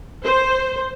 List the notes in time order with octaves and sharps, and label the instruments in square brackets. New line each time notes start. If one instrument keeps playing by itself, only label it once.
[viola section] C5